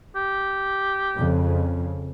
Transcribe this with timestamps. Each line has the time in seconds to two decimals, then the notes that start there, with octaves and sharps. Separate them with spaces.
0.16 G4
1.18 F2 C#3